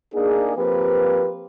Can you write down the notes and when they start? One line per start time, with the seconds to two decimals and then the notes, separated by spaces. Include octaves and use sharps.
0.15 A#3 D4 D#4 G#4
0.57 F3 A#3 C4 G4 B4